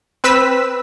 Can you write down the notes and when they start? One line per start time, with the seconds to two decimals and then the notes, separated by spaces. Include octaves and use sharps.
0.24 C4 B4 E6 B6